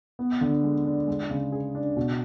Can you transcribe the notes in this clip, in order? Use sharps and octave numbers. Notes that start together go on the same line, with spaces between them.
B3
D3
G#3
D4
G#3
C#3
G#4
D4
B2